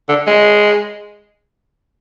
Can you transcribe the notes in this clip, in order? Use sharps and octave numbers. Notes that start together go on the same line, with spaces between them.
D3
G#3